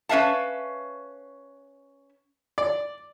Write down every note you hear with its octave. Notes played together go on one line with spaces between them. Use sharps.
C#4 B4 E5 F5 A5
D5